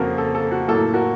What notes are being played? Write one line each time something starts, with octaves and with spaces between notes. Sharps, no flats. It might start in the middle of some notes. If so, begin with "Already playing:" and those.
Already playing: F2 C#3 F3 A#3 F#4 A4 A#4
A4
A4
F#4
A2 F#3 A#3 A4
F#4 A#4